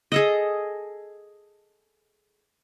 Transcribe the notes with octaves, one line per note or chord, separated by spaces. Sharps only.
G#4 A4 D#5